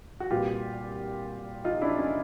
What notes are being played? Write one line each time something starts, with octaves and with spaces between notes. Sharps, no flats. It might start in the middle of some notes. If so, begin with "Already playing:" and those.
F#4
C2 A#2 G3 B3 F4 G4
D#4 F4
D4 E4
C#4 D#4